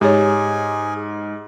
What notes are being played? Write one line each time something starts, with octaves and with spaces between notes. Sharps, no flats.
G#2 G4 G#4 C#5